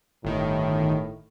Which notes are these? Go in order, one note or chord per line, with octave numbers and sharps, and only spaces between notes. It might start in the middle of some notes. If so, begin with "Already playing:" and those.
G1 A2 D#3